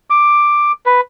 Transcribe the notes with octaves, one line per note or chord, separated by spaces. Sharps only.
D6
B4